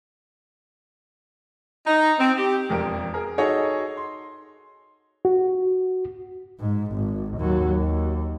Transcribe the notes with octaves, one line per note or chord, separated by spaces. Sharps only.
D#4
C4
G4
E1 F2 A#4 D7
G#4 A#4
D#4 F#4 G#4 A4 C#5 D#5
C6
F#4
G#2
G#1
D#2 F#3
D#2